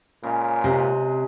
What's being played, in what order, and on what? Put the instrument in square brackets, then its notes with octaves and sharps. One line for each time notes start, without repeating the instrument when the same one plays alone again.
[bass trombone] A#2 [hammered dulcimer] C#3 G#3
[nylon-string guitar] C3 [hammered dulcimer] G#3 A#5